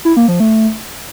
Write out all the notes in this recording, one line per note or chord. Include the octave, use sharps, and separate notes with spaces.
E4
A#3
F3
A3